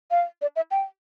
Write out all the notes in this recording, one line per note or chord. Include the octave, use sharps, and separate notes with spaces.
F5
D5
E5
G5